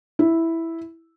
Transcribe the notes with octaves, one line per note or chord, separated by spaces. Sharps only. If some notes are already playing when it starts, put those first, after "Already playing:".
E4